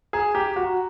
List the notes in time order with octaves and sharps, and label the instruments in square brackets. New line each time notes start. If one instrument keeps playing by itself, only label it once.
[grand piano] G#4 [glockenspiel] A#5
[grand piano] G4 [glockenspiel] A#5
[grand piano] F#4 [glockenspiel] A#5